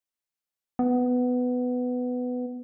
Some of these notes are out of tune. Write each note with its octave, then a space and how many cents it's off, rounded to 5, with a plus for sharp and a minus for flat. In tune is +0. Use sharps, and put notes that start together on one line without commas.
B3 +10